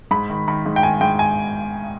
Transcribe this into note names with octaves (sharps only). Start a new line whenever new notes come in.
G#2 B5
D#3
D#3 B5
G#2
G5
D#3 G#5
G#2 G5
G#5